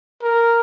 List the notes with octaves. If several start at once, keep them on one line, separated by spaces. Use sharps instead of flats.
A#4